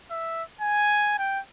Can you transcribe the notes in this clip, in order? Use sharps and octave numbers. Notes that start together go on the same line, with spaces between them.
E5
G#5
G5